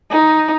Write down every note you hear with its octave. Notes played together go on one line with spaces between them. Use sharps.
D#4